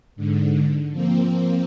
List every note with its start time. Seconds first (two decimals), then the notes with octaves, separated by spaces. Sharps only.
0.16 G#2 D3
0.91 F3 A#3 C4